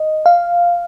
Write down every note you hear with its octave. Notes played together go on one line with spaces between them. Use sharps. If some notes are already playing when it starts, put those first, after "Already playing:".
Already playing: D#5
F5